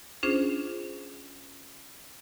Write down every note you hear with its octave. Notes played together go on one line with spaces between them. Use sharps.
C#4 D4 F4 G#4 C5